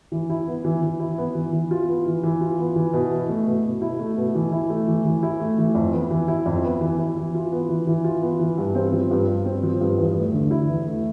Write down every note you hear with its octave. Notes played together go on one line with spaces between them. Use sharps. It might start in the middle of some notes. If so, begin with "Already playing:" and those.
E3
E4
B3
E3
E3
E4
B3
E3
E3
F4
B3
E3
E3
F4
B3
E3
B2
E4
A3
B2
B2
E4
A3
B2
E3
E4
A3
E3
E3
E4
A3
E3
F2
B3
E3
E4
F2
B3
E3
E4
E3
F4
B3
E3
E3
F4
B3
E3
G2
C4
F3
G2
G2
C4
F3
G2
E2
A3
D3
E4
E2
A3